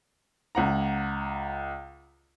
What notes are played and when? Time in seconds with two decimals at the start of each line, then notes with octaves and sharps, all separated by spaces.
0.55 C#2 F#5 A#5